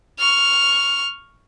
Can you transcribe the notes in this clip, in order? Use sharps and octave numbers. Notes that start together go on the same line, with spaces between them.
C#6 F6